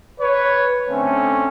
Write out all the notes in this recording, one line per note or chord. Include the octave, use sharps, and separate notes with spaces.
B4 C#5
D3 A3 C4 C#4